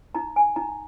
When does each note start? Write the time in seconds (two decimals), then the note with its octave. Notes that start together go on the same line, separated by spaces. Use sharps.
0.15 D#4 A#5
0.36 G#5
0.56 D#4 A#5